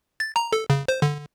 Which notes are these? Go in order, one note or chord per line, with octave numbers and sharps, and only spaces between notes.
A6
A#5
A4
C#3
C5
D3